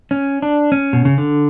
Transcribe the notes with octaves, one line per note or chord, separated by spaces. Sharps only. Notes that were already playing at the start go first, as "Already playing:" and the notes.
C#4
D4
C#4
B2
C#3
D3